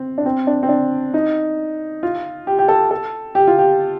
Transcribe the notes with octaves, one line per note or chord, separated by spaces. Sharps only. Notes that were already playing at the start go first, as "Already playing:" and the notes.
Already playing: C4
D4
C4
D4
C4
D4
D#4
F4
G4
G4
A4
A4
G4
F4
G4